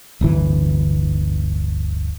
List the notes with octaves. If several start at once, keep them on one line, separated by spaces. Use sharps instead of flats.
D1 G1 E3